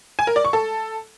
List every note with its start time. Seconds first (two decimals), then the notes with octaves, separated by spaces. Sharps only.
0.19 G#5
0.27 A#4
0.36 D5
0.45 C#6
0.53 A4